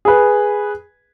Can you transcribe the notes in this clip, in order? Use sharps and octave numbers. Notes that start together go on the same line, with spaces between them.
G#4 B4